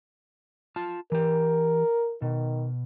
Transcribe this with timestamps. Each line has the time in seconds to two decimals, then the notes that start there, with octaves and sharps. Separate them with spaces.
0.76 F4 A5
1.12 E3 G4 A#4
2.22 B2 D#3